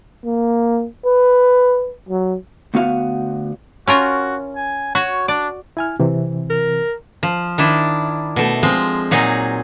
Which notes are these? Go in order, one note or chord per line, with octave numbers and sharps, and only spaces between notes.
A#3
B4
F#3
D2 B3 F#4 F5
C#4 F4 F#4 A#4
G#5
F#4 C#5
D4 D5
E4 G#5 F6
C3 E3 C4
A#4
F3
D#3 D4 E4
B2 A3
F3 G#3 C4
A#2 F#3 D#4 G#4